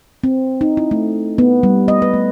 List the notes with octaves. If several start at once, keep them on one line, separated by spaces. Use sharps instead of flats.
C4
D#4
E4
A3
B3
G3
D#5
B4
A3